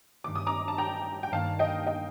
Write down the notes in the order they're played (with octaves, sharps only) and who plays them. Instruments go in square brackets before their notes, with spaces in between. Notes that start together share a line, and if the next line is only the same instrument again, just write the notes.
[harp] G2 D#3 A3 [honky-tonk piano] D6
[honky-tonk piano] D#6
A#5 D6
A5
G5 A#5
G5
[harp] G2 D#3 A#3 [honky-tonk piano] F5 A5
[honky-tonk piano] D#5 G5
D#5 G5